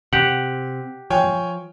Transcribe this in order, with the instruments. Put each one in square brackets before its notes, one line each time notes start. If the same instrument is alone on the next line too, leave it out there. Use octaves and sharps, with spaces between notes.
[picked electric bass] C3 [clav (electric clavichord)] G4 F#5
[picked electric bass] F3 [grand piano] C#5 G5 G#5